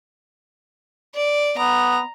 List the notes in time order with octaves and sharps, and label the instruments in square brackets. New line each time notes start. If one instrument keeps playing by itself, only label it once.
[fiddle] D5
[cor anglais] B3 [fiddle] A#5